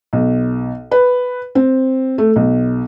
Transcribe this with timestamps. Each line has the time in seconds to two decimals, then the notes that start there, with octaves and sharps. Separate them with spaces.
0.13 B1
0.91 B4
1.55 C4
2.18 A3
2.36 B1